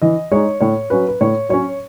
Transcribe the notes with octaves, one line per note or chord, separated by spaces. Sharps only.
E3 D#5
G#3 D#4 C#5
A2 C#5
F#3 C#4 B4
B4
A2 C#5
F#3 C#4 C#5